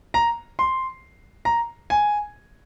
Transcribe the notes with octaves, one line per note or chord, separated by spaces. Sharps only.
A#5
C6
A#5
G#5